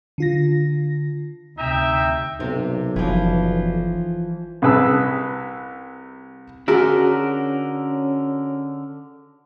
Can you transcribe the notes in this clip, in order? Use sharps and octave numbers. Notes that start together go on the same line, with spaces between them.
D3 F4 A#6
D2 C3 D#4 E5 G5
B1 C3 A#3
F#1 E3 F3
C2 C3 G#4 B4 A5 E6
D3 C#4 F#4 G#4 A#4 E5